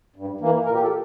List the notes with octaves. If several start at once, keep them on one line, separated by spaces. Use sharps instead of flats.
G2
E3 A#3
A#2 A#4
G4
A4